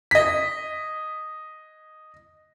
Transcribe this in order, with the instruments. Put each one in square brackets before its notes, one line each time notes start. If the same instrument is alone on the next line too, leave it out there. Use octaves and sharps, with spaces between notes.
[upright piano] D#5 B6